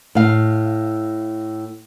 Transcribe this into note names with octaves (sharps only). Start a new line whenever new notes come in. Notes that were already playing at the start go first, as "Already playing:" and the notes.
A2 F5